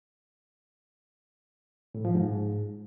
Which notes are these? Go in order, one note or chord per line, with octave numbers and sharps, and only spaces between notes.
A2
F3
G#2